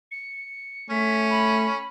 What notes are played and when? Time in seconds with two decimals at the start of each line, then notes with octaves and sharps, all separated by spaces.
0.11 C#7
0.90 A3 C#4 B6
1.30 B5